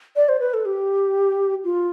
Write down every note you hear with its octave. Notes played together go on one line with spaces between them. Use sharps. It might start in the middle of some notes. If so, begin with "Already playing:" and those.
D5
C5
B4
A4
G4
F4